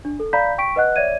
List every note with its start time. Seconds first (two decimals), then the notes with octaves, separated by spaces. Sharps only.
0.05 D4
0.20 A4
0.33 D5 F5 A#5 B5 G6 B6
0.58 G5 C#6 B6 D7
0.76 B4 D#5 F#5 F#6
0.96 C#5 D5 E5 G#6 D#7